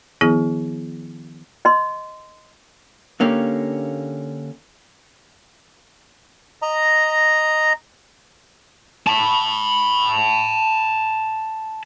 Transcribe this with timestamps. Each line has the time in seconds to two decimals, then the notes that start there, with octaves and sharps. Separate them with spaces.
0.21 D#3 F3 B3 E4 G#4
1.65 D#5 C6
3.20 D3 A#3 C#4 G4
6.62 D#5 A#5
9.07 A5 B5